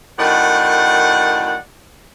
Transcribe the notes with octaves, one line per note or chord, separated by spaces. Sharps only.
F#2 A2 D#3 D5 F#5